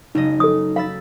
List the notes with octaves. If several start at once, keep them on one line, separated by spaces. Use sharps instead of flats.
F#1 G#3 D#4 D#5
A4 D#6
F5 B5 E6 A6